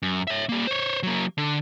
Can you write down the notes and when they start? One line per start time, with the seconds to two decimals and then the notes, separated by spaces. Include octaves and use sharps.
0.02 F#2
0.27 C#5 E5
0.49 G3 A#3
0.67 C5 C#5
1.03 F#3 A#3
1.38 D3